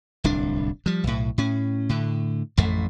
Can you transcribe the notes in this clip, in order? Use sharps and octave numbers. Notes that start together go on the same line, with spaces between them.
D1 C2 D4
F3 G3
B1 A2
A2 C#4
A2 D3
A1 F2 A2 A3